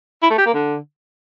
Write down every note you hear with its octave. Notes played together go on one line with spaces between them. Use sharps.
E4
A3
G4
A#3
D3